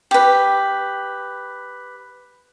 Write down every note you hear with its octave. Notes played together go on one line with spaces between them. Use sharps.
G4 B4